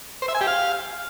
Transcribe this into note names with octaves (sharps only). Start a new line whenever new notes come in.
C5
E5
G#5
G4
F5